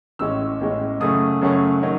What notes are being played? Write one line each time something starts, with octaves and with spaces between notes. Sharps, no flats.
A1 A2 G#3 C#4 E6
A1 A2 G#3 C#4
F#2 C#3 F#3 A3 C#4 D#6
F#2 C#3 F#3 A3 C#4
D#3 F#3 C#4